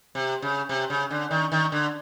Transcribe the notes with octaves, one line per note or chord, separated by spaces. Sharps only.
C3
C#3
C3
C#3
D3
D#3
D#3
D3